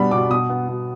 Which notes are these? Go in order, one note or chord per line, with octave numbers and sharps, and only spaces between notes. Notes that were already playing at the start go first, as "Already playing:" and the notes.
Already playing: B2 G3 B3 B5
B2 D6
B2 D#6
B3
B2